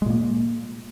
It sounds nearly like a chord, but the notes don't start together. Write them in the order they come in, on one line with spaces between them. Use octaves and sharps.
G#3 A#2 A#3